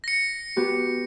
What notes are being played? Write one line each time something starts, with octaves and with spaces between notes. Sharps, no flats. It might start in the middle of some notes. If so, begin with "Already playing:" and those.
A#6 C#7
B3 F#4 G4